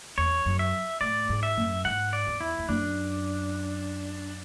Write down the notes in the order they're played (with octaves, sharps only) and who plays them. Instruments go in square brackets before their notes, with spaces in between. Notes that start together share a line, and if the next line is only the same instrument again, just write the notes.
[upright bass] E2 [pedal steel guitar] C#5
[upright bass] F#2
[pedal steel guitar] E5
[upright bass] A2 [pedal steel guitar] D5
[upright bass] G#2
[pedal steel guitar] E5
[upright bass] F#2
[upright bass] G#2 [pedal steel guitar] F#5
[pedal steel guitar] D5
[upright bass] E2
[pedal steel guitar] E4
[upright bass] E2
[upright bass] F#2 [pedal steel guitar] D4